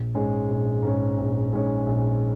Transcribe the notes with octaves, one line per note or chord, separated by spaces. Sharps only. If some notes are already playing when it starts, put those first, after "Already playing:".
Already playing: A#1
G#2 G#3 C#4
A#1
G#2 G#3 C#4
A#1
G#2 G#3 C#4
A#1